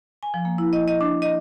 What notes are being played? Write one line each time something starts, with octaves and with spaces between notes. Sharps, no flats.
G#5
F3
A#3
E4
D#5
D#5
D4
D#5